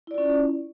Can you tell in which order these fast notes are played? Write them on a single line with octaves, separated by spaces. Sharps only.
E4 D5 F4 C#4